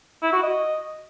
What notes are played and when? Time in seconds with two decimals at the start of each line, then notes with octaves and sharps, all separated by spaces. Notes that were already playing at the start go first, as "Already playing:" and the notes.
0.23 E4
0.33 F#4
0.43 D#5